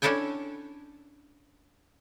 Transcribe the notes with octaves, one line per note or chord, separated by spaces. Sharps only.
C#4 D4 E4 A4 G5 G#5